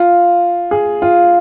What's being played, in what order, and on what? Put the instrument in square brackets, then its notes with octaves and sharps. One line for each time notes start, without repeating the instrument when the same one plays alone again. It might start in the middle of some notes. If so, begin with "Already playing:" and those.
Already playing: [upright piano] F4
G#4
F4